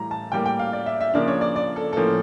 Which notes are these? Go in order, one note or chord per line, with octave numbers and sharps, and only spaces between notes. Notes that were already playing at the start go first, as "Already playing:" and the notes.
Already playing: A2 E3 G3 A#5
A5
A2 G3 A#3 G5
G5
F5
D5
E5
E5
C#3 F3 A#3 D4 D5
C#5
D5
D5
A4
A2 F3 A#3 C#4 A4